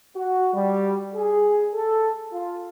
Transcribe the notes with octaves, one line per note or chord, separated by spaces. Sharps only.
F#4
G3
G#4
A4
F4